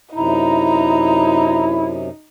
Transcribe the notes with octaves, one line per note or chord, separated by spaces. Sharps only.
F#2 C3 D#4 E4 A#5